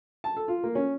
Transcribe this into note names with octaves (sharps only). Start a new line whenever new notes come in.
A5
A4
F4
A#3
C#4